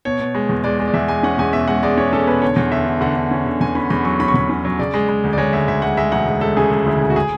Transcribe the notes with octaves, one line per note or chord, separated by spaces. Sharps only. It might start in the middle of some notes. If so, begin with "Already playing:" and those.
B2 C#5
B2
G#3
E2
G#3 D5
G#3
D5
E2 E5
G#3 G#5
C#4 F#5
E2 G#5
B2 E5
G#3 F#5
G#3 D5
C#4 C#5
C#4 A4
B2 B4
D3 C#5
E2
D3 E5
D3
D3 F#5
D3
C#4
D3
E2 G#5
C#4 B5
E2 B5
F#3 C#6
C#4 B5
C#6
E2 B5
C#4
F#3
C#3 D5
G#3
G#3
D2
D5
G#3 C#5
D2 E5
D2 E5
G#3 F#5
G#3 E5
E1 F#5
G#3
G#3 A4
C#3 G#4
G#3 A4
D2 E4
C#3
F#4
G#4